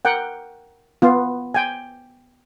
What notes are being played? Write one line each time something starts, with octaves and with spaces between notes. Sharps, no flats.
A#4 F#5 G5
B3 F4
G5 G#5